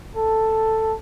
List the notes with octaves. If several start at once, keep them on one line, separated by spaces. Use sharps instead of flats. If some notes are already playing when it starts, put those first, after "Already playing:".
A4